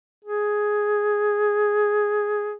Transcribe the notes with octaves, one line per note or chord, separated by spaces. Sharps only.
G#4